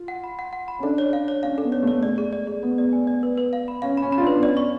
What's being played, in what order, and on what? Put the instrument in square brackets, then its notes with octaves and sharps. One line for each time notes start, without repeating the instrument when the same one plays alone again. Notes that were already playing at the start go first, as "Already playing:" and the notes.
Already playing: [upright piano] F4
[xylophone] F#5
B5
F#5
F#5
B5
[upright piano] C#4
[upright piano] D4 [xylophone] A4
[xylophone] C#5
F5
C#5
[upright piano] C#4 [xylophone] F5
[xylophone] A4
[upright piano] B3
[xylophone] C#5
[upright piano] A3 [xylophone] C#5
[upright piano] G#3 [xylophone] D5
[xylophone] G#4
D5
G#4
[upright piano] B3 [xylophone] G#4
[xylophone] D5
G#5
D5
B4
B4
F5
B5
[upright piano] C#4 [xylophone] F5
[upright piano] C#4 [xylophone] B5
[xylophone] B5
[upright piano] F4
[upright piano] D4 [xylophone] B4
[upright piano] B3
[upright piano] C#4 [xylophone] D5
[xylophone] C#6